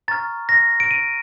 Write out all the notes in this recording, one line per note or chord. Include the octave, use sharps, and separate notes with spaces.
A#5 C#6 F6 A6
A#6
D7
D#7